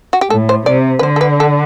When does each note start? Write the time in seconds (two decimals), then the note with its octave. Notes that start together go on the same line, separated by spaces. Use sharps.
0.13 F#4
0.21 G4
0.30 A2 A4
0.49 C5
0.66 C3 D5
0.99 B4
1.03 D3 C5
1.16 A4
1.21 B4
1.40 A4